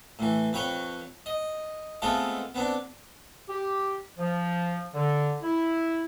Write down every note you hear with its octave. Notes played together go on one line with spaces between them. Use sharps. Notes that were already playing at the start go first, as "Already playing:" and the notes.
A2 E3
F2 B4 C#5 G5
D#5
G#3 A3 B3 C4 F4 A4
B3 C4 D4
G4
F3
D3
E4